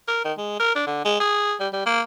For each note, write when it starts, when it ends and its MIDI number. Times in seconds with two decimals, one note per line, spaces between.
0.08 0.22 70
0.25 0.33 51
0.38 0.59 56
0.60 0.73 70
0.75 0.85 62
0.87 1.02 50
1.05 1.19 56
1.20 1.54 68
1.60 1.68 55
1.73 1.82 55
1.86 2.01 58